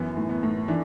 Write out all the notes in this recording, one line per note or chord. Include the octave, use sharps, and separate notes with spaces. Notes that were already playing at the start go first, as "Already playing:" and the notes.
Already playing: F#2 E3 B3
A2
B3
A2
E3 D4